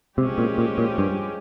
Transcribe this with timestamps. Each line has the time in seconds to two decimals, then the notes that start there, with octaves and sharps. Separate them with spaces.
0.17 C3 F3 G#3 C#4 G4
0.38 A#2
0.58 A#2
0.78 A#2
0.98 G2